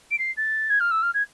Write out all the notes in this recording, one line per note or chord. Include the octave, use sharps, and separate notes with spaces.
D7
C7
A6
G#6
F6
E6
F6
G#6